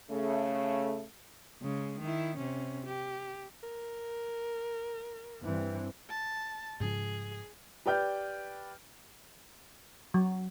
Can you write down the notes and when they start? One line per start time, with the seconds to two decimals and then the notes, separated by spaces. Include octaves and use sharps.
0.10 C#3 A3
1.62 C#3 G#3
2.00 D#3 E4
2.37 C3 C#4
2.86 G4
3.63 A#4
5.42 G2 E3 C4
6.09 A5
6.80 G#2 C#3 F3 G#4
7.86 G4 B4 D5 G5 F6 G6
10.14 F#3